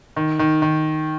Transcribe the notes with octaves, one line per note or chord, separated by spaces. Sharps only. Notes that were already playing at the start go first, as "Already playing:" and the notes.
D#3
D#3
D#3